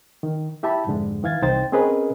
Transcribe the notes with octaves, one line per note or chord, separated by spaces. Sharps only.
D#3
E4 G4 E5 A5 B5
F2 G#2 D3 G#3
D#3 E3 F5 G#6 A6
C2 D#4 C5 G5 A6
C4 C#4 G#4 A#4 B4 D#5